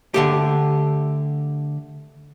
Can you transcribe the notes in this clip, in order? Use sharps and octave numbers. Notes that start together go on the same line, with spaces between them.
D3 A3 G4